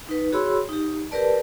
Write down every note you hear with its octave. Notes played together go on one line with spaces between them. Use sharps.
D#4 B4
F#4 G#4 C#5 B5 C6 E6
D#4 G4
G4 A#4 B4 D5 A5